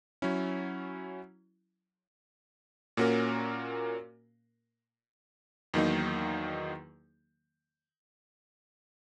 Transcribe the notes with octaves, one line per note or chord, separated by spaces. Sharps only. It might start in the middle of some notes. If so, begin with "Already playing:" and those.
F#3 C#4 E4
A#2 A#3 C#4 F#4 A#4
E2 D#3 F#3 A#3 D#4